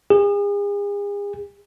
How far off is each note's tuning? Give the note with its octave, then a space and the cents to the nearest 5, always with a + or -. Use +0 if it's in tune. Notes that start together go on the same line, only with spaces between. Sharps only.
G#4 -40